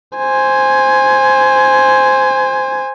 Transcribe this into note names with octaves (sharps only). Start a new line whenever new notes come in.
C5 G#5